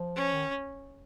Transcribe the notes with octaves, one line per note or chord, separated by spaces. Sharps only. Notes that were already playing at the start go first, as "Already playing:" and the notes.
Already playing: F3
C#4
D#3